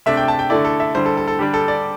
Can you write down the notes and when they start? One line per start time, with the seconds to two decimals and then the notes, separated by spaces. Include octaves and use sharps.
0.06 C3 A3 D4 E5
0.17 G5
0.28 A5
0.39 G5
0.50 D3 A3 E4 D5
0.65 A4
0.80 E5
0.95 D3 G3 E4 C5
1.06 A4
1.17 A4
1.28 A4
1.39 D3 G3 D4 G4
1.54 A4
1.68 D5